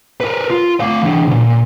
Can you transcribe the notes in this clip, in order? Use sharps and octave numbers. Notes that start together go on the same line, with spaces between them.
A#4 B4
F4
A3 F5
E3 D4
C#2 A#2